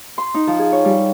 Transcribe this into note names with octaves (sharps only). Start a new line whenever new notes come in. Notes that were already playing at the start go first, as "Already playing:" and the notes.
C6
D#4
F3
G#4
C#5
G3